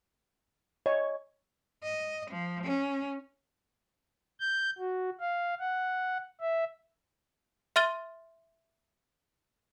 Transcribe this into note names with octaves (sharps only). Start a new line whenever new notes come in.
C#5 D#5
D#5
F3
C#4
G6
F#4
F5
F#5
E5
E5 C6 F6 A6 D#7 G7